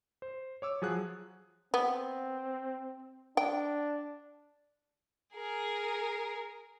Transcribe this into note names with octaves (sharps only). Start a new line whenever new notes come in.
C5
C#5 D6 E6
F3 F#3 G#4 F#5 F#6
B3 C4
D4 G5
G#4 A#4